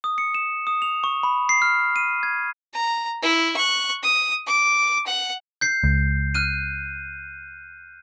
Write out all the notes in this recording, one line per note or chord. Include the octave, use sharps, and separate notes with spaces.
D#6
C#7
E7
D#6
F7
C#6
B5
C7
F6
D#7
G#6
A#5
E4
C#6 F#6
D#6
D6
F#5
G6 C7
C#2
F6 F#6 D#7